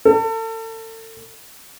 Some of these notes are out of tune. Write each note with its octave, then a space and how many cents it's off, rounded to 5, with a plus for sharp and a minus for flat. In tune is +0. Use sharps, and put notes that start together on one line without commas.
A4 +35